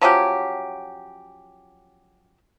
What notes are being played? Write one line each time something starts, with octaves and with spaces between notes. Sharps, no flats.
F3 F#3 C#4 G4